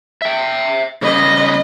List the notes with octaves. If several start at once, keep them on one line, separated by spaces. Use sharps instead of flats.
E5 G5
C#3 G3 B4 D#5